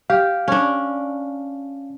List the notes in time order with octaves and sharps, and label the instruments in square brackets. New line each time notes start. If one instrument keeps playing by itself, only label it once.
[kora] G4 [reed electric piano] F5
[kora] C#4 D4